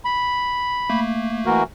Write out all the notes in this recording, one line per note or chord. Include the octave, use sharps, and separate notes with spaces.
B5
A3 A#3
E3 F#4 A#4